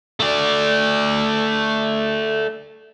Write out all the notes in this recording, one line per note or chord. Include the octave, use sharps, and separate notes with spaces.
A3 D5